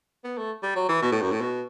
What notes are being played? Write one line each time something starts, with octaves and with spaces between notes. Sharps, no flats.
B3
A3
G3
F#3
E3
B2
A2
F#2
A2
B2